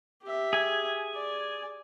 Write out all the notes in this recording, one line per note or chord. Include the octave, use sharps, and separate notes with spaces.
G4 E5
G#4 G#5
D5